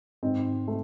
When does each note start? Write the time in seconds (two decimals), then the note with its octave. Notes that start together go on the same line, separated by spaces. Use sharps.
0.23 G#2 D#3 C4 D#4
0.68 A3